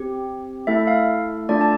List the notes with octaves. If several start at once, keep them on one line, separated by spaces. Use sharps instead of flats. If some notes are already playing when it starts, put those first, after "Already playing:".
Already playing: C4 G4
A3 E4 A4 E5
F5
A3 D4 F4 A4 D5
A5